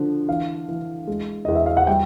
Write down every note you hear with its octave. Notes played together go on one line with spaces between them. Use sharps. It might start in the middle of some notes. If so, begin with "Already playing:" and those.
Already playing: D3 F3
E3 F5
E3
G#3
E2 D#5
E5
F5
F#5
G3 G5